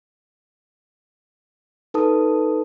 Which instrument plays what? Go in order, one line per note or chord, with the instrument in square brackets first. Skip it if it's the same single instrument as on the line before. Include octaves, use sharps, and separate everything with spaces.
[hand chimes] D#4 A4 B4 A5 D#6